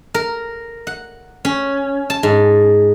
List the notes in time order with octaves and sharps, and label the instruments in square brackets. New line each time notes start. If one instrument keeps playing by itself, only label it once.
[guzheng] A#4
F#5
C#4
A5
G#2